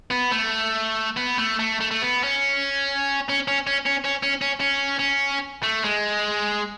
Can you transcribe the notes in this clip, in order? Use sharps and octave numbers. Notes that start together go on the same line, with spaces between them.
B3
A3
B3
A3
A3
A3
A3
B3
C#4
C#4
C#4
C#4
C#4
C#4
C#4
C#4
C#4
C#4
A3
G#3